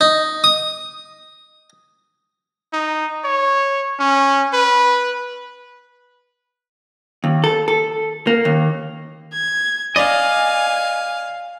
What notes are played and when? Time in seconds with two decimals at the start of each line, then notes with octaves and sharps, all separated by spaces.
0.01 D#4
0.44 D#6
2.73 D#4
3.25 C#5
4.00 C#4
4.54 B4
7.24 D#2
7.44 A4
7.68 A4
8.27 A#3
8.45 D#2
9.33 G#6
9.96 D5 D#5 F5 G#5